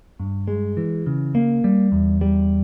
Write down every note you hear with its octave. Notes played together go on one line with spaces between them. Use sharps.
G2
G#3
E3
C#3
A#3
G3
E2
G3